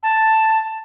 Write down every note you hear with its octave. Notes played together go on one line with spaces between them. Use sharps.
A5